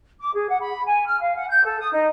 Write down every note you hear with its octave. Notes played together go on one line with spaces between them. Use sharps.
D6
G#4
F#5
B5
G#5
F6
F5
F#5
G6
A4
D#6
D#4